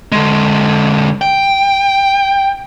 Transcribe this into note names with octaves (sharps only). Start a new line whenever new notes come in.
D3 G#3
G5